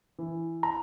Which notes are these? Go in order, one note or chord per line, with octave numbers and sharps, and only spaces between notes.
E3
A#5